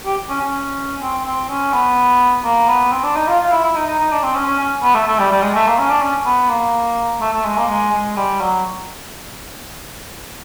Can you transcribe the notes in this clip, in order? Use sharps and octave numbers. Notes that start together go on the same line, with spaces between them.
G4
C#4
C#4
C4
C4
C#4
B3
A#3
B3
C4
D4
D#4
F4
F4
E4
E4
D#4
D#4
D#4
D4
C4
C#4
C#4
C#4
B3
A3
A3
G3
G3
G#3
A3
A#3
C#4
D4
C#4
B3
A#3
A3
A3
G#3
A#3
G#3
G#3
G3
F#3